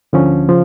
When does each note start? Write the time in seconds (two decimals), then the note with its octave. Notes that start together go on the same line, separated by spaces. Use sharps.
0.13 D2 D3 F3 C#4
0.48 C#3 F3